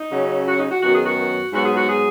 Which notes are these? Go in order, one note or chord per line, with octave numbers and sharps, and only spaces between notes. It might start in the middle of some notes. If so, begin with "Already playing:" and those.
Already playing: D#4
C#3 F#3 C#4
F#4
D#4
F#4
F#2 D#3 B3 F#4
G#4
F#4
G#2 F#3 B3 F#4
G#4
F#4
G#4